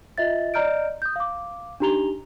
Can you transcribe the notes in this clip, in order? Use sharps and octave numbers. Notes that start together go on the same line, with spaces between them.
F4 D#5 E5 A6
D5 D#5 A#5 F6 G6 D7
D#6 G6
F5 D6
D4 D#4 G4 A#5 F7 G7